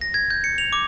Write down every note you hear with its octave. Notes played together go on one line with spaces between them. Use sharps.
A#6
G#6
G6
C#7
F7
D6